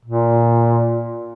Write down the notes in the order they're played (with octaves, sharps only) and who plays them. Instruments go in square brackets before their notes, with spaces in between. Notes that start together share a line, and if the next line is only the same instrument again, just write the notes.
[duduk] A#2